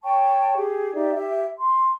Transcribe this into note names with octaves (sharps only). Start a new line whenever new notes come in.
C#5 G5 A5 C#6
G4 G#4
D#4 G4 D5 E5
G4 E5
C6